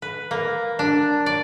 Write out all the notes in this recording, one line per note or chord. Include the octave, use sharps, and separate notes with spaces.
B4
A#3
D4
D5